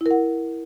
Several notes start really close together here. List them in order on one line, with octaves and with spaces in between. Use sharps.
E4 A#4 F#5